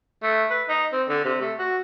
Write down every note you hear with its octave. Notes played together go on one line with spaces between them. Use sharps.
A3
B4
D#4
C4
D3
C3
A3
F#4